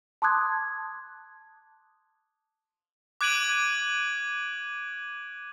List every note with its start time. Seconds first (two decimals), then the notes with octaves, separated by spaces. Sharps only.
0.22 A5 C6 D6 D#6 F#6 G#6
3.21 D6 F#6 G#6 D7 D#7 F#7